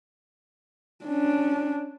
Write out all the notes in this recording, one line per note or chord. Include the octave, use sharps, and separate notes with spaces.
C#4 D4